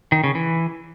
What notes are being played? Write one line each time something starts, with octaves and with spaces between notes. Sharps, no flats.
D#3
C#3
E3